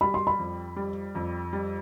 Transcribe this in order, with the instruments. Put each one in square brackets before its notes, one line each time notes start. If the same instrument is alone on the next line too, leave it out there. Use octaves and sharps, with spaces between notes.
[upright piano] G3 [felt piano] B5
[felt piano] C6
B5
[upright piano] F2
G3
F2
G3